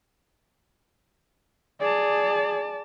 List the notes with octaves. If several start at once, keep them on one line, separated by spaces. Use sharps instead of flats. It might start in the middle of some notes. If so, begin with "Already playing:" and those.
G#4 D5 A5